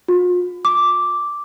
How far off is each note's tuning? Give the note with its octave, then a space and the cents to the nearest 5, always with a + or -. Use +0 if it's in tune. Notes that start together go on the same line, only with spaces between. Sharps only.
F4 +45
D6 -5